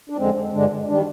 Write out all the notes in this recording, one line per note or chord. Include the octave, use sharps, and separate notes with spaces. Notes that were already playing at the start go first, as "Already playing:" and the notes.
D4
F2 D3 G#3 C4
G2 D3 G#3 D4
D#3 G3 D4